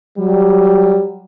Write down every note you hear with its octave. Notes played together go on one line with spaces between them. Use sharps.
F#3 G3